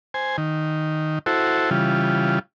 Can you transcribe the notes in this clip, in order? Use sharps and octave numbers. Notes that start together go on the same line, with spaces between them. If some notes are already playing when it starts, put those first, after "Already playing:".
C5 G#5
D#3
E4 F#4 A4 C5
C#3 E3 G3 F4